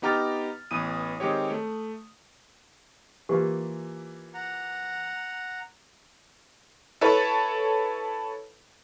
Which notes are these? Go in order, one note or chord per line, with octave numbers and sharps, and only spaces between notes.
B3 D#4 G4 A#5 F6 A6
A1 E3 B3 D#6 D#7
D#3 G#3 C4 G4 C#5
A3
E3 A#3 F4 G4
F#5 A#5
E4 A4 B4 C#5